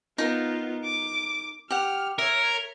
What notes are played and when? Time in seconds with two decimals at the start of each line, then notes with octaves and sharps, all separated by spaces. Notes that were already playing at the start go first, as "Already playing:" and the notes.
0.18 B3 D#4 F4 A#4
0.84 D6
1.71 G4 F#5 F6
2.19 A#4 C#5 E5